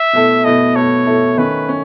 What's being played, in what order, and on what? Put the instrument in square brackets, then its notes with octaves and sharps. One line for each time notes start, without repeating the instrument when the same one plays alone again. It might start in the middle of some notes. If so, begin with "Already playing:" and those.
Already playing: [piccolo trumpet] E5
[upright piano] B2 A3 E4 A4
[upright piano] B2 A3 E4 A4 [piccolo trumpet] D#5
[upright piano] B2 A3 E4 A4 [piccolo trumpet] C#5
[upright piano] B2 A3 E4 A4
[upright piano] D#3 A3 C#4 [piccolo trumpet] B4
[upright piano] C#4